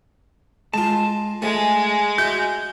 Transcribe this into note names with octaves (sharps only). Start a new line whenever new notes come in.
G#3 F4 A5
G#3 A3 G#5
F#4 E5 G6